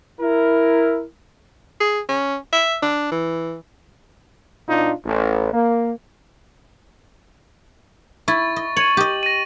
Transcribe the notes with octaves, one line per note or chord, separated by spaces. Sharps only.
E4 A#4
G#4
C#4
E5
D4
E3
B2 D4 D#4 F4
A1
A#3
E4 C#6 A6
D#5
C#5 D#7 F#7
G4 D#5
A#6 D#7